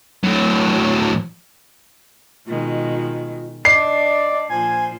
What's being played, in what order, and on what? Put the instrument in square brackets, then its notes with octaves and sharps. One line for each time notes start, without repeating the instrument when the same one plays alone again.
[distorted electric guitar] A2 F#3
[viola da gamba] B2 D#3 G#3 [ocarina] F4
[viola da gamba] D4 [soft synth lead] D5 [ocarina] D#5 [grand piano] C7
[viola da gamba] A#2 F3 C5 [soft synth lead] G#5